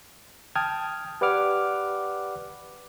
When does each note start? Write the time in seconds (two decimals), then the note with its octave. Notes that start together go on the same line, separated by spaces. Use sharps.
0.55 G5 A5 D#6 F6 G#6
1.21 G4 B4 D5 F#5 D6 F6